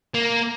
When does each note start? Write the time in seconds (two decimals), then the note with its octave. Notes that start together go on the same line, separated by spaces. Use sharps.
0.14 A#3